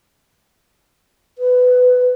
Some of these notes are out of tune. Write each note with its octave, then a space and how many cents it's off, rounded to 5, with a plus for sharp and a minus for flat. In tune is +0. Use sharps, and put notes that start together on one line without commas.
B4 +15